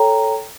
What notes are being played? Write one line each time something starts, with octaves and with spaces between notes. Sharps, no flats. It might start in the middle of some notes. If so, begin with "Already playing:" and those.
Already playing: A4 C#5 G5 A#5